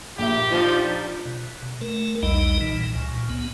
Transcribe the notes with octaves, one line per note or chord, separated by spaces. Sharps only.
A#1 G4 E5
F3 G3 D4 D#4
B2
A3 A#4
B1 E2 G3 D#4 D#5
A#2 E3
C#2 A#2
B3